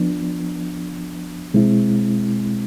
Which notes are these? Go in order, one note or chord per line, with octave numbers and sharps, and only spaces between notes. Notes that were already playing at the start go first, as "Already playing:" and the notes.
Already playing: F3 B3 D4
B2 G#3 C4 E4